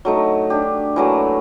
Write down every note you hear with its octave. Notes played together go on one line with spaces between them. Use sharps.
F#3 A3 D#4
D4 G4
E3 F#3 A3 A#3